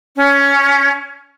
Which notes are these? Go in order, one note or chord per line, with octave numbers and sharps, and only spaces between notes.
C#4